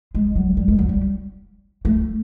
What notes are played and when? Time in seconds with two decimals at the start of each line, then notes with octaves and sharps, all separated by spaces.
0.15 G#3
0.36 F#3
0.57 G3
0.68 G#3
0.78 F#3
0.89 G3
1.85 A3